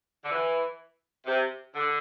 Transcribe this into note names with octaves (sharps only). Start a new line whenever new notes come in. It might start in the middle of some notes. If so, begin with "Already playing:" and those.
D3
E3
C3
D3